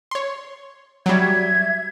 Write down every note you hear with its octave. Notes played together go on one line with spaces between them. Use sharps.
C#5 C6
F#3 G3 E5 G#6